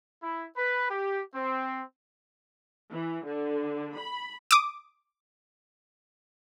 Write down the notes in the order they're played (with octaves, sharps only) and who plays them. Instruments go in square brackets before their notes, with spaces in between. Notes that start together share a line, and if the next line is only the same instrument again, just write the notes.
[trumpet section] E4
B4
G4
C4
[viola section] E3
D3
B5
[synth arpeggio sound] D6 D#6